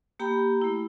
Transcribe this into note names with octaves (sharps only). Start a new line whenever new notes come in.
A#3 G4 G5 A#5 B5
A3 E4